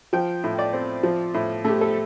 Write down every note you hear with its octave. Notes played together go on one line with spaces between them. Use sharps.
F3 G5
A2
D5
C4
F3
A2
A3 G4
A4